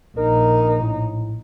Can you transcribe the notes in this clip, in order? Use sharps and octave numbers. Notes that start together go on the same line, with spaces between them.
A#1 D#4 A#4
A2